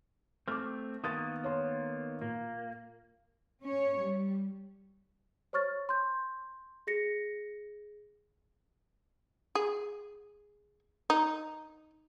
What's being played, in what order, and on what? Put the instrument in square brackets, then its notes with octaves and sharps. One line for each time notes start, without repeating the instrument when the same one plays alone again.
[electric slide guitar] A3 C4 [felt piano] D6 F6
[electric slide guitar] D#3 A#3 B3 [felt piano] D#6 A6
[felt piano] C#5 C6
[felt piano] A#2 [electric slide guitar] A#3
[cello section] C#4 C#5
G3
[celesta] C5 C#5 C#6 F6 A6
C6 G6
G#4 A#6 C#7
[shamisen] G#4
D#4